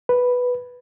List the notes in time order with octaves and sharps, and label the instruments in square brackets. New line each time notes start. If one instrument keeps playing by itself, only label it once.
[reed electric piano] B4